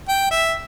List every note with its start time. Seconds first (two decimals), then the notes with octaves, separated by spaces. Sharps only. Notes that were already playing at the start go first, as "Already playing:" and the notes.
0.08 G5
0.31 E5